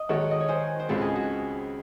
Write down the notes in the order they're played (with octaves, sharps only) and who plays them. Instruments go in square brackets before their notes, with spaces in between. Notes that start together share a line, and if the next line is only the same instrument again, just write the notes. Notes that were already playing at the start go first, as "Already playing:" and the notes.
Already playing: [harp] D#5
[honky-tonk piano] D#3 G#3 D#4 F#4 [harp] A4 C#5
[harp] D#5
C#5
G#4 C5
C5
[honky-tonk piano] C#2 C#3 G#3 C4 [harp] F#4 A4
[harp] G#4
F#4